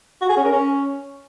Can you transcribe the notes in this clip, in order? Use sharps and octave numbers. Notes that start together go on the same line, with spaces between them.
F#4
G#4
C#4
A#4
C#4